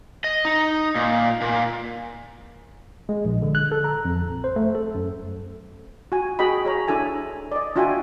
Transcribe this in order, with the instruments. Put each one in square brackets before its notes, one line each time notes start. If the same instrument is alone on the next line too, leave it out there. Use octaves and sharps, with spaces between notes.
[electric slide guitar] D#5
D#4
A#2
A#2
[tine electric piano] G#3
A#1
D3
F#6
A4
A#5
F2
A#1
C5
A3
A4
F#2
[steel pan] F#4 G#5
F#4 G#4 D#5 G5 B5
G#4 C#5 A#5
D4 E4 A4 G#5 A5
D5 D#5
D4 F4 F#4 E5 G5 G#5